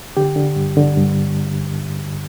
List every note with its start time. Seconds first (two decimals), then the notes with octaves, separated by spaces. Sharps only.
0.17 D3 G4
0.36 D3
0.56 G2
0.77 D3
0.97 G2